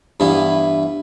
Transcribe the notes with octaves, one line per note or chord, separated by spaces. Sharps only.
G2 E3 B3 E4